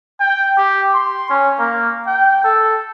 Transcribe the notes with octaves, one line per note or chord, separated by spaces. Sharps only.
G5
G4
C6
C#4
A#3
G5
A4